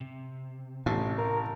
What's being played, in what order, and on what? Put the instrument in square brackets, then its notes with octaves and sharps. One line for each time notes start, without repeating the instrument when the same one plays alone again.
[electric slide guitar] C3
[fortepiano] A1 [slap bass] A2
[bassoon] A#4